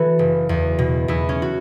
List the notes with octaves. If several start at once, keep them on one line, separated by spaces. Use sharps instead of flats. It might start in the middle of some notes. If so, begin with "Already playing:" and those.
Already playing: E3 F#4 A4 B4
F#1
E2
B2
E2 E4
C#4
F#4